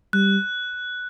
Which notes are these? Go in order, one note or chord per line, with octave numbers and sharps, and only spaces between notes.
G3 F#6